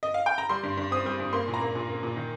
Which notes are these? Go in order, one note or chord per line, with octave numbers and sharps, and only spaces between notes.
D#5
F5
G5
A#5
G3 C6
G2
G2
C4 D#6
G3
G2
A#3 C6
A#2
A#5
A#3
A#2
A#3
A#2
D#3